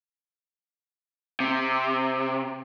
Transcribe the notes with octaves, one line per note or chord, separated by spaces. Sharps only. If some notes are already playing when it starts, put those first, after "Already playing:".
C3